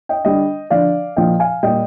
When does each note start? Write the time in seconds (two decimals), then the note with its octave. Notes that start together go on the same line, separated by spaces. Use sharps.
0.09 D#5 G5
0.25 D3 G3 D#5 G5
0.70 D3 F3 D5 F5
1.16 A#2 F3 D#5 G5
1.40 F5 G#5
1.63 A#2 G3 D#5 G5